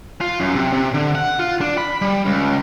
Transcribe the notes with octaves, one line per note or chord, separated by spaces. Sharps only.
F4
F#2
C3
C3
D3
F#5
F4
D4
B5
G3
C#2